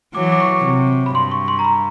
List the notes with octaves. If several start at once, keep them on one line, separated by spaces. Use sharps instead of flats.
E3 F#3 D6
D6
C#6
C3
B5
G2 C6
C#6
C6
A#5
B5